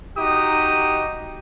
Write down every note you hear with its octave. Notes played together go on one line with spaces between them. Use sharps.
D#4 F#4 G4 D#6